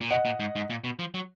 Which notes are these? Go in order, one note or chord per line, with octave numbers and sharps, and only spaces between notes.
A#2
B2 D#5 F#5
A#2
G#2
G#2
A#2
B2
F3
F#3